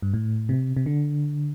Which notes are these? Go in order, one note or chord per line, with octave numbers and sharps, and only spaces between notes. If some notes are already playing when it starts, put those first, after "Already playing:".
G2
A2
C3
C3
D3